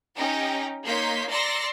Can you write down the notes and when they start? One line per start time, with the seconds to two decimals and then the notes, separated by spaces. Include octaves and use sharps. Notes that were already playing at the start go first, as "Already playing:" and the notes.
0.15 C#4 D#4 G4 G5 A#5
0.84 A#3 D#4 C#5 C6 G6 B6
1.29 D5 A#5 C6 E6 A#6 C#7